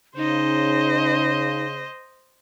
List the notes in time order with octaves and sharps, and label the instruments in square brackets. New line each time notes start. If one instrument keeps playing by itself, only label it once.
[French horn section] C#3 [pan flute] D#4 [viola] C5 D#5